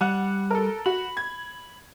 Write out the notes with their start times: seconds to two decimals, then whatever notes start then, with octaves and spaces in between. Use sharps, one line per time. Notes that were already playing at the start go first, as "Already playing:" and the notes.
0.01 G3 F#5 F#6
0.50 A4 A#4
0.86 F#4 B5
1.17 G#6